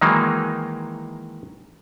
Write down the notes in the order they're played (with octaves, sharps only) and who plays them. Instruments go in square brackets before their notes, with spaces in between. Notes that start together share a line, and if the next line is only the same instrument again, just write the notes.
[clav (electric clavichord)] D#3 E3 F#3 G#3 A#3 D#4